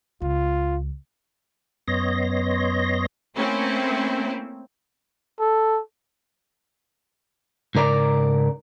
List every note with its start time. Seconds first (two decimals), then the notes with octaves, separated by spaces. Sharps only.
0.22 C#2 F4
1.88 F#2 B3 C#5 D#5 C6 A#6
3.36 A3 A#3 C4 C#4 E4
5.40 A4
7.75 G#2 C#3 A#4 D5 A#5